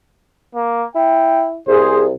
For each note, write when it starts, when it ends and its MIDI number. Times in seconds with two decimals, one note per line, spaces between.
0.55 0.85 58
0.95 1.58 64
0.95 1.45 79
1.68 2.12 36
1.68 2.05 68
1.68 2.01 72